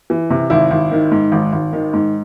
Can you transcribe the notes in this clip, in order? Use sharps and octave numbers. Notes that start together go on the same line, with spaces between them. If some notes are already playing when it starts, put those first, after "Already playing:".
E3
C3
G#1 E4
G#1
D#3
G#2
G#1
G#1
D#3
G#2